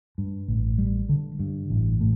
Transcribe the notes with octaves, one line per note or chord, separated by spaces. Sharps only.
G2
A1
G3
D3
G2
A1
A2